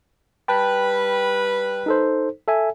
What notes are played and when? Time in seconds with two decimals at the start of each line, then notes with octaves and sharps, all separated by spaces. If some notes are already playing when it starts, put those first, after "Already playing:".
0.48 G3 B4 G5 A5 B5
1.86 D#4 A4 C5
2.48 A4 E5 G#5